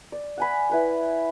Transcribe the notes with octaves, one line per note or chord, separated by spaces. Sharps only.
D5
F#5 G#5 B5
E4 B4 B5